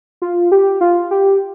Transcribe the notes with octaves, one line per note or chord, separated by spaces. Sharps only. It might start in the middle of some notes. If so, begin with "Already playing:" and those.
F4
G4
F4
G4